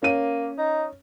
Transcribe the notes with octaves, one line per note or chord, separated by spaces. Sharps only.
A#3 C#4 D#7
D#4